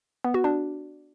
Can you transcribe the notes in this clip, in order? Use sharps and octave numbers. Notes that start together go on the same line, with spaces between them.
B3
F#4
D4